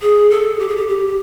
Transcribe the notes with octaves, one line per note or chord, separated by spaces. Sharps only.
G#4
A4
G4
G#4
G4
G4
G4